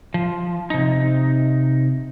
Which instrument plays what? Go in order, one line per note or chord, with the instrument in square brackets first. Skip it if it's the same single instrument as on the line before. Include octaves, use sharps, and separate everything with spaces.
[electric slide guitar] F3
C3 D#4